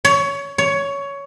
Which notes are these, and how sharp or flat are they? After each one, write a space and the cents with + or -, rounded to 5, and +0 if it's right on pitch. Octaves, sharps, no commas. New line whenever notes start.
C#5 +20
C#5 +15